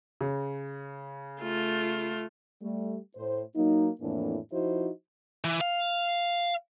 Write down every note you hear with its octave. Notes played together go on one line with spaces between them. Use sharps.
C#3
A3 F4
G3 A3
A2 C5
F#3 A#3 D#4
F2 A2 E3 A#3 D4
F3 D#4 E4 F#4 C5
E3
F5